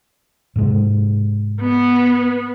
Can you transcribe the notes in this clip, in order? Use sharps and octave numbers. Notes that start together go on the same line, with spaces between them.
G#2 C3 G#3
B3